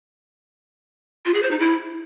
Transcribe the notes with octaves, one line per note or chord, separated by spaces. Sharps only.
F4
G#4
C5
D#4
E4